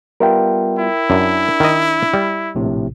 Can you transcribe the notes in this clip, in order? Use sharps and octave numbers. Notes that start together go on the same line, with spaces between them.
G3 B3 F4 A#4 E5 G5
E4
F#2 D4
D#3 D#5
G3
A#1 A2 C3